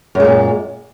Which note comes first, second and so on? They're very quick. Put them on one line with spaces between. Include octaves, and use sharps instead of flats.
F#2 G#3 A#2